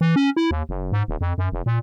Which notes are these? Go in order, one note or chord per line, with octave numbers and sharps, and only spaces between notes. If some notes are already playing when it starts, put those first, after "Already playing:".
E3
C#4
E4
D#2
F#1
G#2
D#1
F2
F#2
F1
A#2